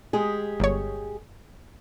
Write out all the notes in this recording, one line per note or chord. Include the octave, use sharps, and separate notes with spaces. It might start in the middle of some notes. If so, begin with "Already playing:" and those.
G#3 G4 G#4
G1 C#5